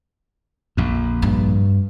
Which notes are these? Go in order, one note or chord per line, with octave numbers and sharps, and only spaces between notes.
A#1 F2
G2